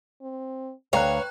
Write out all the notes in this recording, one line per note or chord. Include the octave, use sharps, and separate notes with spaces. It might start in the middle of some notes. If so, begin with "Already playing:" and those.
C4
D2 B4 C#5 F5 G5 A#5 F#6